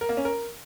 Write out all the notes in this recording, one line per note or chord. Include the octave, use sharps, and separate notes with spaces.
A#4
A#3
C#4
A#4